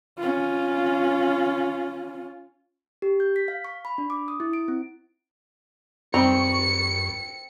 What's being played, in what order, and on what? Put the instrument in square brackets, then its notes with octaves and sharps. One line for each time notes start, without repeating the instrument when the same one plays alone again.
[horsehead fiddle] C#4 F4
[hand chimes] G4
G6
B6
F5
C#6
B5
D4
D6
D#6
E4
D7
C4
[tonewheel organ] F#2 C#6 [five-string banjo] D#3 G3 A#5 [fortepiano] C4 [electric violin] C#7